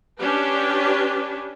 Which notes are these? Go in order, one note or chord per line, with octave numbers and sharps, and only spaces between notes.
C#4 D4 G4 B4